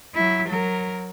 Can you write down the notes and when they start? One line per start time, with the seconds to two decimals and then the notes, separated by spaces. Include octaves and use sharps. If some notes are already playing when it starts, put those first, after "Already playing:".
0.15 F#3 E4
0.47 F#3 A#4